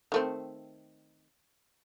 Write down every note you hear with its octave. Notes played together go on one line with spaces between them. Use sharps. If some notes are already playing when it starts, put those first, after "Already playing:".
D#3 A3 C4